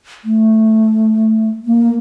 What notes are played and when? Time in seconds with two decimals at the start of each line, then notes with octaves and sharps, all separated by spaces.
0.25 A3
1.66 A#3